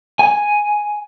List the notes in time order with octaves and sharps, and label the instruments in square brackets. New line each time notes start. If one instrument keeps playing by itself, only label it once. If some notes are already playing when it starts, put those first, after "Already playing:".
[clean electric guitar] G#5